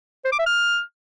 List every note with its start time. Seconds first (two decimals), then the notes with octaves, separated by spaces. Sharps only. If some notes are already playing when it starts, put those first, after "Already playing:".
0.25 C5
0.32 D6
0.39 E5
0.46 F6